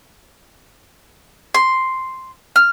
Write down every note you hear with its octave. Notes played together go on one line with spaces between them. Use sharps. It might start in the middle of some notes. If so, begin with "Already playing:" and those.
C6
F6